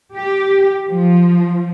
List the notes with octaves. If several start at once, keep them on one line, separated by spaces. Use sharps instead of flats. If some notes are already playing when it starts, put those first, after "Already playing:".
G4
F3